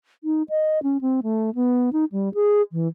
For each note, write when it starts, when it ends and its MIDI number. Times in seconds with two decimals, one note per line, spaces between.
0.24 0.43 63
0.49 0.82 75
0.83 1.01 61
1.01 1.21 60
1.23 1.54 57
1.55 1.90 59
1.93 2.05 63
2.12 2.33 55
2.34 2.62 68
2.72 2.87 52